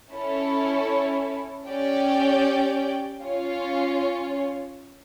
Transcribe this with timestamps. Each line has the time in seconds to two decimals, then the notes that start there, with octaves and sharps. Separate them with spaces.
0.12 C#4 E4 A4 C#5
1.66 C#4 G4 D5 G5
3.21 C#4 F4 C#5